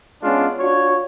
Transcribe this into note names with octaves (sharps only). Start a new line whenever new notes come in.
G#3 B3 C#4 D4 F4
D4 F4 F#4 C#5